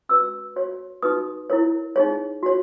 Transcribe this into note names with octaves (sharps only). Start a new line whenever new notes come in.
C#4 F#4 B4 E6
F#4 C#5
D#4 F#4 B4 D#6
E4 A#4 C#5
D#4 G#4 C#5
F#4 C#5